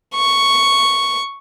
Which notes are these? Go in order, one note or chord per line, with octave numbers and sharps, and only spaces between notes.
C#6